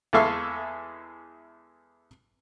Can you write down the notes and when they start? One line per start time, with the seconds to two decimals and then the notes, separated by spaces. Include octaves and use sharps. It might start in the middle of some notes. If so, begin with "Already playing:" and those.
0.13 E2 G#3 A4 E5 F5 C#6